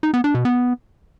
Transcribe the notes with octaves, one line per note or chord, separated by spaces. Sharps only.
D#4
B3
D4
B2
B3